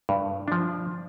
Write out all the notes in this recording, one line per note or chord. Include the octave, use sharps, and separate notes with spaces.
G2
F3 D4